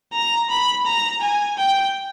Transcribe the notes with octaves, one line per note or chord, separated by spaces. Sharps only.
A#5
B5
A#5
G#5
G5